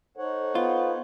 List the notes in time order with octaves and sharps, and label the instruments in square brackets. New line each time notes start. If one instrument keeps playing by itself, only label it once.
[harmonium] D#4 C#5 F#5 [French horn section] A4 C5
[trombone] B3 [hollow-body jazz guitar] F4